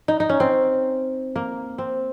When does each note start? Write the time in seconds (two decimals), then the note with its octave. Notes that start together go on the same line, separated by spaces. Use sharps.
0.08 D#4
0.20 D#4
0.29 C#4
0.40 C4
1.36 A#3
1.78 C4